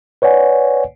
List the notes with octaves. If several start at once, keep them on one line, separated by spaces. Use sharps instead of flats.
B4 C#5 D5 F#5 G#5